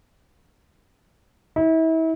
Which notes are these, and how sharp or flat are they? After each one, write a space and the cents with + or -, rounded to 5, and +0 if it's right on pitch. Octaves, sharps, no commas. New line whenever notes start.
E4 -35